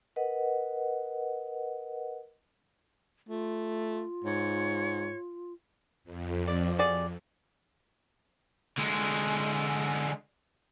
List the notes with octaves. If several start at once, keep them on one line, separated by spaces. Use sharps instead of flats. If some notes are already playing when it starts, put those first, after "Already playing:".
A#4 B4 D#5 F#5
A3 F4
G#2 C#5
F2
D5
F#4 G#4 D5
D3 G#3